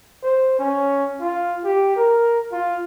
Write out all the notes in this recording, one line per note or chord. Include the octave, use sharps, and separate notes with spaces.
C5
C#4
F4
G4
A#4
F4